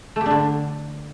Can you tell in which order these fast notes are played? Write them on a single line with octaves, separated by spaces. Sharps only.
A3 G4 D4 D3